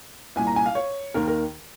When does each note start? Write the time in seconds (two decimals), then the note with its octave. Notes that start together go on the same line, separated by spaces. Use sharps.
0.36 C2 A#2 G#5
0.47 A#5
0.56 G#5
0.66 F5
0.75 C#5
1.14 D#2 D#3 A#4
1.28 A#4